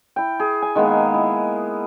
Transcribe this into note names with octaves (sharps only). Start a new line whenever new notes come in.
E4 G5
G#4
G#5
D#3 G#3 A#3 B3
E4